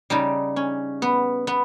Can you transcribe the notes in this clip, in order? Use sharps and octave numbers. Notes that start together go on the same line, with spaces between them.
C#3 G3 D#4
C#4
B3
B3